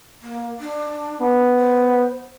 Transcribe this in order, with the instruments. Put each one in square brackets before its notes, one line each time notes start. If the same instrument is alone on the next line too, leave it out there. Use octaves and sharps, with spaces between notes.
[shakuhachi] A#3
D4
[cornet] B3
[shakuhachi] C5